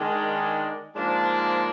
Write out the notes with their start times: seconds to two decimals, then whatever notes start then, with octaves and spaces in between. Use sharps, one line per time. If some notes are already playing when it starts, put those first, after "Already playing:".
Already playing: D#3 G#3 D4
0.95 G#2 F3 A#3 D4